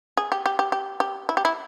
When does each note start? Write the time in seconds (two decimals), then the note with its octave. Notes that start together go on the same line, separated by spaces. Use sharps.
0.17 G#4
0.32 G4
0.46 G4
0.59 G4
0.72 G4
1.00 G4
1.29 E4
1.37 G4
1.45 E4